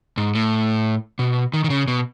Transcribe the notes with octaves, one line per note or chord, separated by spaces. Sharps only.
G#2
A2
B2
D#3
D#3
C#3
B2